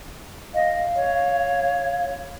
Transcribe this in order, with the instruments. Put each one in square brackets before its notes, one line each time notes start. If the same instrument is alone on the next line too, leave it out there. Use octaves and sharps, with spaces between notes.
[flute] D#5 [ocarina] F5
[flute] C#5